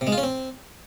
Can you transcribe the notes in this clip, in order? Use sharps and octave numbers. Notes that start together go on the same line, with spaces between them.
C3
G#3
F4
C#4
C4